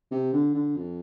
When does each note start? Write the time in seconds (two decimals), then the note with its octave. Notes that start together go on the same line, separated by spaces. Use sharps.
0.12 C3
0.33 D3
0.55 D3
0.76 F2